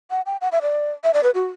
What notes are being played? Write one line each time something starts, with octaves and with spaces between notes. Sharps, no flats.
F#5
G5
F#5
E5
D5
E5
D5
B4
F#4